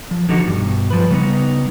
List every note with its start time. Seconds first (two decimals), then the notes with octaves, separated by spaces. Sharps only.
0.11 F3
0.29 D3 E3 F3 D#4 F#4 G4
0.47 G2 B2
0.90 F3 B4
1.10 C#3 G3 B3 D#4